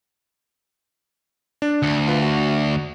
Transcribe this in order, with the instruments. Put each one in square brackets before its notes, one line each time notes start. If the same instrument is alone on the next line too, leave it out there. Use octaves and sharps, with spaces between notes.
[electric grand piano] D4
[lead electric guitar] D2
[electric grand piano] F4 B4
F#4